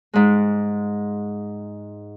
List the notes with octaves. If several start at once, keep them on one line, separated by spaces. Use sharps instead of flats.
G#2 G#3